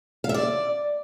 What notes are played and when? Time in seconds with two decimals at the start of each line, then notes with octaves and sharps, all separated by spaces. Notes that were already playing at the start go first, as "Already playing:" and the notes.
0.24 F5
0.29 E5
0.34 D5